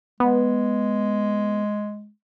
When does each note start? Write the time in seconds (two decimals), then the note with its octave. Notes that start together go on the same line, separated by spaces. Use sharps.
0.20 G#3 B3